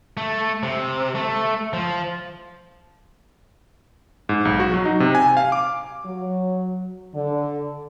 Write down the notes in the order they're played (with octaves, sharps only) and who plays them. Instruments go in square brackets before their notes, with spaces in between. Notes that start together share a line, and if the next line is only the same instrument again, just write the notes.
[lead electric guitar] A3
C3
A3
F3
[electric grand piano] G#2
B1
F#4
F#3
D#4
C3
G#5
F5
D6
[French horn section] F#3
D3